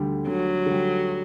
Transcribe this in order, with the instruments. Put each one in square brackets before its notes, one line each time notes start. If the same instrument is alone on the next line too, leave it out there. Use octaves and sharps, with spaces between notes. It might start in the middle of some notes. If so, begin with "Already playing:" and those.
Already playing: [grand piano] D2 D3 G3
[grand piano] D2 [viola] F#3
[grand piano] D3
G3